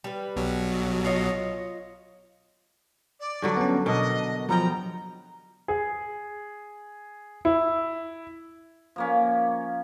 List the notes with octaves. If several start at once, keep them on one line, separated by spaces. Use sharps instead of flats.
G3 B4
B1 B2 F#3
F4 C#5 D#5
D5
G2 D3 F#3
B3 C#4
B2 D4 A#4 D#5
F3 F#3 B3 G5 A#5
G#4
E4
F3 A#3 C#4